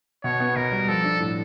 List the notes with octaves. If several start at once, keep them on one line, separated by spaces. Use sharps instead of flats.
B2 C#5
B3
B2 A#4
G3
F3 A4
D4
A2